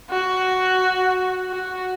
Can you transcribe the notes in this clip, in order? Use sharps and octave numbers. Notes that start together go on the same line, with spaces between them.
F#4
F#4